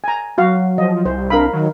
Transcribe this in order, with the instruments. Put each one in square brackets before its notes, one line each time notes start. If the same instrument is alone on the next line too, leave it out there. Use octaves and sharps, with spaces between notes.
[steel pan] G#5 A#5
[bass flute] F#3 [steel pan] F#4 F5
[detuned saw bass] F3 [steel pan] D#5
[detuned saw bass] C2 [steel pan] C5
[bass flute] D4 [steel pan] A#4 F5 B5
[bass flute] D#3 [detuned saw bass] F#3